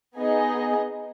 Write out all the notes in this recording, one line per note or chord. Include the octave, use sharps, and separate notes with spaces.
B3 D#4 G#4 D#5 G#5